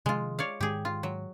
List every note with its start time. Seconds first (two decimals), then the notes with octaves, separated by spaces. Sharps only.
0.06 C3 D#3 F3 G#3 F4
0.39 C#5 D5 F5
0.61 G#2 D#3 G#3 G4 G#4
0.85 F4
1.03 F#3